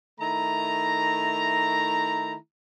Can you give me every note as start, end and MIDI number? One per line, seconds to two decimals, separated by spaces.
0.20 2.35 51
0.20 2.35 57
0.20 2.35 64
0.20 2.35 82